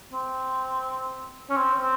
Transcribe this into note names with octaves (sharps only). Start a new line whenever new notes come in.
C4
C#4
C4
C4